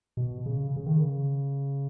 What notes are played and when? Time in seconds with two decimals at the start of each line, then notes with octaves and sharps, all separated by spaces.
0.17 B2
0.46 C#3
0.76 C#3
0.86 D#3
0.97 C#3